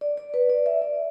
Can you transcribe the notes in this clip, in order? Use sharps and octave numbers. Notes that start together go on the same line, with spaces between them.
D5
D5
B4
D5
E5
D5